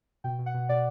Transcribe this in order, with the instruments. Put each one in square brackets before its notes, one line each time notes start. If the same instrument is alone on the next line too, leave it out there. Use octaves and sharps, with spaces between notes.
[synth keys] B2 G5
B2
F#5
B2
B2 D5